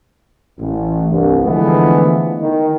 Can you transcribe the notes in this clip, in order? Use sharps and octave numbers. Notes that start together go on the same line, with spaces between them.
A1
C2 G2
D3 E3 F3 G#3 A3 B3
D#3